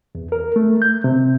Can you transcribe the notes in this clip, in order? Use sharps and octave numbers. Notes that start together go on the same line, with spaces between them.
E2
A#4
A3
G6
C3